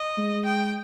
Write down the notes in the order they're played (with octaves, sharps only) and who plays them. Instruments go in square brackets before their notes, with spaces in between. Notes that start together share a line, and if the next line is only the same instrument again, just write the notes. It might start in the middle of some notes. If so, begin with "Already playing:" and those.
Already playing: [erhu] D#5
[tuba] G#3
[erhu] G5